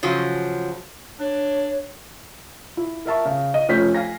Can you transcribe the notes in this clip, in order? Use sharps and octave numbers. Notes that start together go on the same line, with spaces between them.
C#3 F3 F#3
D4 C#5
E4
A#4 E5 A5 C#6
C#3
D#5
F1 F2 C#4 G#5 G6 B6
F5 G#5 A#6